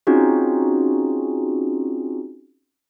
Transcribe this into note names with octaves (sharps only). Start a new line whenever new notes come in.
C4 C#4 D#4 F4 F#4 G#4